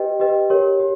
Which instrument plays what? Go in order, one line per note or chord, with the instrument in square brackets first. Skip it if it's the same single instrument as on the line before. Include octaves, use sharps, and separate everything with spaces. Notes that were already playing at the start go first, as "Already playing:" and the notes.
Already playing: [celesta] G4 B4 D#5 G5
G4 B4 D#5 G5
G4 A#4 C#5
G4